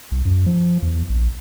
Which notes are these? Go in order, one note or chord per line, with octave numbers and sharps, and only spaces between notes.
C2
F#2
F3
E2
A#1